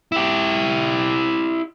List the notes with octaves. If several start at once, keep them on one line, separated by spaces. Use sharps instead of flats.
E4 G4